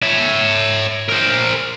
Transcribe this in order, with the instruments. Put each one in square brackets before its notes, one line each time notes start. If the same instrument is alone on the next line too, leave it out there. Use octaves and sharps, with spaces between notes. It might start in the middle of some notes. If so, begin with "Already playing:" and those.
[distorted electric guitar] C#5 E5
A#4 C5